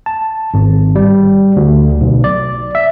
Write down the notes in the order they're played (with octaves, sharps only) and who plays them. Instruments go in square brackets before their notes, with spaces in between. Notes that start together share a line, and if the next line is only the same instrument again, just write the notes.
[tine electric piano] A5
G#1
G3
D2
B1
D5
E5